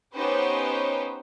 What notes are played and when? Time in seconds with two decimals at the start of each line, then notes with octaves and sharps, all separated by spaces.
0.13 B3 C#4 D#4 G4 B4 C5